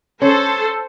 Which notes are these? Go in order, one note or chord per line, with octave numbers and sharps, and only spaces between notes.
C#4 A4 C5